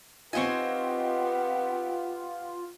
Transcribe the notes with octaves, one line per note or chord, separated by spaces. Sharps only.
B3 C4 D#4 F4 G4 C#5 D#5 G#5